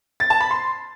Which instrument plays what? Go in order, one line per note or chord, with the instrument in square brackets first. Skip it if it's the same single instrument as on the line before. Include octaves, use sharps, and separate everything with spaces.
[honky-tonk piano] A6
A5
B5
C6